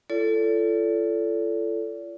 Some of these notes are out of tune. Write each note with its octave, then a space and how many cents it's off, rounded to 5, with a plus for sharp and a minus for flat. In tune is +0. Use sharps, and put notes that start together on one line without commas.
F4 -40 A4 +0 D5 -40